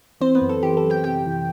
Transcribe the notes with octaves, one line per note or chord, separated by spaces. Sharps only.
E3 C4 C5
B3 B4
F#2
A4
E3 G4
A4
F#2
G4 G5
C3 G4 G5
E3